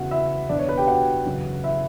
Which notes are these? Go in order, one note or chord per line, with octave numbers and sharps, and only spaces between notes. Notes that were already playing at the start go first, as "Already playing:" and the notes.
Already playing: E2 C#3 E3 F#4 F#5
E4 E5
E2 B2 D4 D5
C#5
B4
G4 G5
F#4 F#5
F#2 C#3 E3
E4 E5